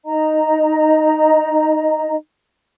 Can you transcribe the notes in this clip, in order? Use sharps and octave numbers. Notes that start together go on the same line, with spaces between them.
D#4 D#5 A#5